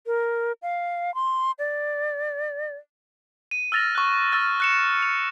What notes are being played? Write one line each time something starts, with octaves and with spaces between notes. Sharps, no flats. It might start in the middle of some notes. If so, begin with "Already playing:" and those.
A#4
F5
C6
D5
D#7
E6 F6 A6 A#6 F7
C#6 F#6
E6 F6 A6
F#6 C#7 E7
F7